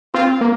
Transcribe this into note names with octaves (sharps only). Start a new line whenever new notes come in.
C4 F4
A#3